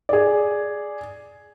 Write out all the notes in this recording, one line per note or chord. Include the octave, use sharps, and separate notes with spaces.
G#4 D5